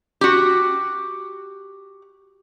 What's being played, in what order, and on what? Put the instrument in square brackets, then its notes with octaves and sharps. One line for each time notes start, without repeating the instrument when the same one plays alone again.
[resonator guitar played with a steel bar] F#4 G4